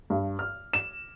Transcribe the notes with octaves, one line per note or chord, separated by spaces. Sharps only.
G2
F6
E7